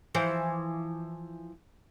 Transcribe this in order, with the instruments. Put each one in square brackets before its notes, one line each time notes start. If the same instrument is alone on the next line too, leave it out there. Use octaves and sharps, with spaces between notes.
[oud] E3 F3 C5